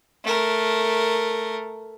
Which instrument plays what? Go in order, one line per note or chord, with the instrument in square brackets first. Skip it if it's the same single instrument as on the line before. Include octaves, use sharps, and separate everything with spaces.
[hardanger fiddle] A3 A#4